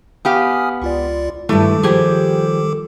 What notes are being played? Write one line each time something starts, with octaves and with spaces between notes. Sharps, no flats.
B3 G4 F5 G#5 D#6 F6
C#2 F4 D5
G2 D#3 G3 A3 E4 A4 D6
F3 G3 G4 G#4